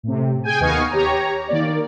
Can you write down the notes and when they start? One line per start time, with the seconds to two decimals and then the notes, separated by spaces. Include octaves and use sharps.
0.03 A2 C3
0.44 G#4 G5 G#5
0.60 D#2 B3 D#5 F5 G#5 C#6
0.91 G4 C#5 A#5
1.48 D#3 A#3 D5